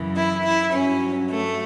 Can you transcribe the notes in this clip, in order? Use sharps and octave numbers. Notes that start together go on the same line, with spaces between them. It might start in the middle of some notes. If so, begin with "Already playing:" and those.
Already playing: F#2 C#3 E3
E4
E4
G2 F#3 C#4
A3